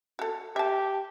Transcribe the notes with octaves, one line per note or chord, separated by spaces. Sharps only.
F#4 A4
G4 E5 A5